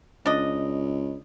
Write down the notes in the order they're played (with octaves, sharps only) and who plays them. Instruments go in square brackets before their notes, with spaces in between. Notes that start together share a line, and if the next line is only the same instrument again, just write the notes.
[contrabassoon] C#2 [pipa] D4 D#5